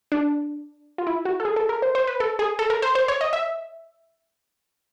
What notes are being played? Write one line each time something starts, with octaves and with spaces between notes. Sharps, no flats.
D4
F4
E4
F#4
A4
G#4
A4
A#4
C5
C5
B4
A4
G#4
A4
A#4
C5
C5
C#5
D#5
E5